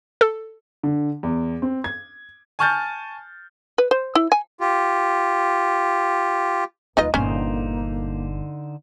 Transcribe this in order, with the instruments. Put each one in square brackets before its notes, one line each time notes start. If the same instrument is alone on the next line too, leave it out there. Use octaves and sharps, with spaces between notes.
[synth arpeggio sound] A4
[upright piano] D3
E2
C4
G#6
G#5 A5 C#6 F6 G6 A6
[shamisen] B4
C5
E4
G#5
[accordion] F4 G4
[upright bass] D#2 G3 [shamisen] D#4 F4 D#5 [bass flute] B4
[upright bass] G1 A#2 [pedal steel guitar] D3 D#4 C5 [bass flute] A#3 [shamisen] C#4